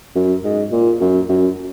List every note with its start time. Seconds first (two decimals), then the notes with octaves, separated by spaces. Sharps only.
0.15 F#2
0.44 G#2
0.72 A#2
1.01 F#2
1.29 F#2